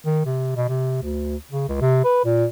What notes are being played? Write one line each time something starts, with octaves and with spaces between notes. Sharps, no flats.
D#3
C3
B2
C3
D2
C#3
C#2
C3
B4
A#2